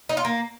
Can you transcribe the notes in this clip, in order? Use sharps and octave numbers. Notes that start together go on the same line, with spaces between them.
D#4
F4
A#3